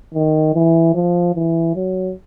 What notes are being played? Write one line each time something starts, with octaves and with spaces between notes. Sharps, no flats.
D#3
E3
F3
E3
F#3